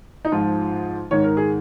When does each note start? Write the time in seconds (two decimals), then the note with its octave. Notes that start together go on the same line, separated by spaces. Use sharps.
0.25 D#4
0.32 G#2 F3 F4
1.11 G#2 D#3 C#5
1.24 A#4
1.37 G#4